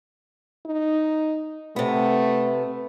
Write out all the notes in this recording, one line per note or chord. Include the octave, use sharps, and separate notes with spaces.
D#4
C3 A3 B3